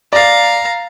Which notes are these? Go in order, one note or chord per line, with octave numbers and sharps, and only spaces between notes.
D5 F5 A#5 A6